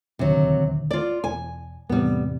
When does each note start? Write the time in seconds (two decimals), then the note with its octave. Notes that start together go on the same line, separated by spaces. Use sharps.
0.19 D#1 D2 C3 D#3 F#3
0.91 F4 D5
1.24 E1 G#5
1.89 E2 A2 C3 G3 B3